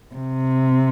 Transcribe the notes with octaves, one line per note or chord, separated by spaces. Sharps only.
C3